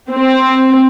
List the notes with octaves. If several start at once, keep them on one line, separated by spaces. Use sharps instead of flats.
C4